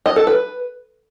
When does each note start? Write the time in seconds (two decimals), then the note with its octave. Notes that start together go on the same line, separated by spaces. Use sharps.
0.06 D#5
0.16 A4
0.27 B4